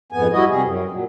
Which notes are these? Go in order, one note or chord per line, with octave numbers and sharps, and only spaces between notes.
F2 G#2 B3 G#5
F#3 G3 E4 F#4 D#5
C3 G3 G#4
F#2
A#2 F#3